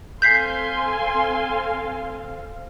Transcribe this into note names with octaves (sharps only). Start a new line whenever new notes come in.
C4 A4 F5 G#5 C6 G6 B6 C7